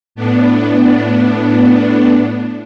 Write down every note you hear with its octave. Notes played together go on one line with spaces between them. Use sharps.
A2 B3 D4